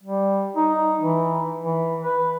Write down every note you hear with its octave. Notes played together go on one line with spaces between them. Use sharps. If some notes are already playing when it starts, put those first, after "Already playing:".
G3
D#4
E3
E3
B4